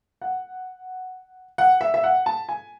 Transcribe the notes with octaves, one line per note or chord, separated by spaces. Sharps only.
F#5
F#5
E5
E5
F#5
A5
G#5